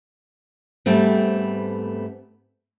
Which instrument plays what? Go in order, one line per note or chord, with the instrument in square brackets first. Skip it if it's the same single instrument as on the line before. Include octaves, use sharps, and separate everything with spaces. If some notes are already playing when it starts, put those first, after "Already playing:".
[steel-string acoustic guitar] G#2 G3 A3 B3 C4